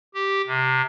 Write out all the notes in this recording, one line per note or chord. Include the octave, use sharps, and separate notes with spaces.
G4
C3